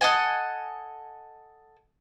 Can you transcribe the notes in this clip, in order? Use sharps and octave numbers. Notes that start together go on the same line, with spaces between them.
A4 D#5 F#5 G#5